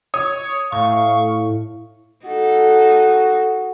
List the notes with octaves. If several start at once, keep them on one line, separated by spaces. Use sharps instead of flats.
C#5 D#6
A2 F5 C#6
D#4 F#4 A4